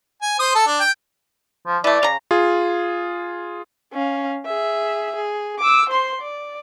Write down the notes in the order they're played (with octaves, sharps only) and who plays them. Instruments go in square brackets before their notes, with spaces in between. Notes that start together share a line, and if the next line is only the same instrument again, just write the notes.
[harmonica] G#5
C5 D#6
A4
D4
G5
[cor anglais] F3
[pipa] E3 A3 [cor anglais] D5
[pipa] C#3 A#5
[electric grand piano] F4 G#4
[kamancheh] C#4 F5
G#4 E5
G#4
D6 E6
C5 C6
D5